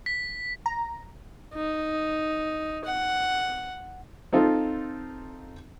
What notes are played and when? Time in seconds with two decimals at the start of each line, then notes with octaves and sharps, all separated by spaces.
0.06 B6
0.66 A#5
1.54 D#4
2.84 F#5
4.33 C4 D#4 F4 A4